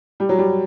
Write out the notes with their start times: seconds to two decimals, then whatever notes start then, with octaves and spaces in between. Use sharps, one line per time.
0.20 G3
0.29 F#3
0.38 G3